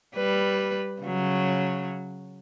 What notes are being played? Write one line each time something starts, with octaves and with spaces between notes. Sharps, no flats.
G3 B4
C#3 F#3